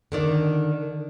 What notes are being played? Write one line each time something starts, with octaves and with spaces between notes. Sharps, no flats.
D3 D#3 D5